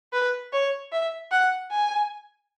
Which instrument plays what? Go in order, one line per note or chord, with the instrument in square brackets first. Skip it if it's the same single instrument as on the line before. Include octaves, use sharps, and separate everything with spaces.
[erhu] B4
C#5
E5
F#5
G#5